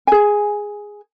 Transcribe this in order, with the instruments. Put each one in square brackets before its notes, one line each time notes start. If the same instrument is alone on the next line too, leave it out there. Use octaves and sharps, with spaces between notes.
[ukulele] G#4 G#5